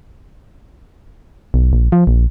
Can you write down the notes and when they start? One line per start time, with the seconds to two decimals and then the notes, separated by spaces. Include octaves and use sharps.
1.54 B1
1.73 A#1
1.92 F3
2.07 A#1